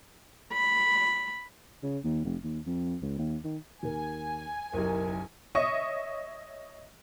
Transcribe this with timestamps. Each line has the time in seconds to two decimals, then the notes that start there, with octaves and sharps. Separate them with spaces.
0.53 B5
1.83 C#3
2.04 D#2
2.25 F1
2.44 D#2
2.66 F2
3.02 C#2
3.18 D#2
3.44 D#3
3.83 D#2 A#4 G#5
4.74 F#1 B1 E4 G4 A#4
5.55 C#5 D#5 E5 C#6 D#6